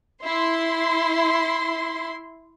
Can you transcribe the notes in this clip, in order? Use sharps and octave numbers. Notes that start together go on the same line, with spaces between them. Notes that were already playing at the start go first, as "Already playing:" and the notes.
E4 C6